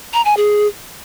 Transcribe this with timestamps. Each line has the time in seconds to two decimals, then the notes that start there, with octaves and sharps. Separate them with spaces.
0.14 A#5
0.25 G#5
0.37 G#4